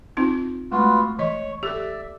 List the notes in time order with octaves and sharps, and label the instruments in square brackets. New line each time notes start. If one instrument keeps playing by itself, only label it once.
[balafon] C4 D#4 F4
[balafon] G#3 A3 [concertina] B3 F4 F#4
[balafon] E3 D#5 [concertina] C#5
[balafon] G4 A4 [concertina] D5 E5